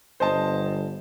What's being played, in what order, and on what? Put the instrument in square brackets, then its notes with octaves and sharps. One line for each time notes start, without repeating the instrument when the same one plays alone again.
[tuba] G1 [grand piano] C5 D#5 A5